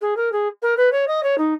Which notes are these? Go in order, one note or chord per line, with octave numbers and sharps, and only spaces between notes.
G#4
A#4
G#4
A#4
B4
C#5
D#5
C#5
D#4